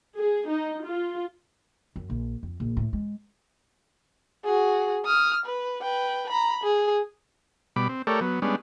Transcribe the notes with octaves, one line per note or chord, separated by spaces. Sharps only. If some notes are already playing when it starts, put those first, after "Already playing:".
G#4
D#4
F4
F#2
A#1
F2
A#1
A2
G#3
F#4 G#4
D#6 F6
B4
B4 G5
A#5 B5
G#4
B2 G3 B5 D6
C4
A3 G4 A4 A#4 C#5 D5
F#3 B3
G3 G#3 B3 C#4 D4